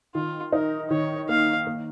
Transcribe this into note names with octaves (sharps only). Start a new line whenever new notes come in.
D#3 F4
D#4 A#4
D#3 C#5
A#3 F5
A#3